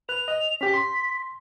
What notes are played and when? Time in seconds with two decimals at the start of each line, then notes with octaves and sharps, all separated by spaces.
0.09 B4 F#6 F7
0.28 D#5
0.61 C#4 G4 B6
0.74 C6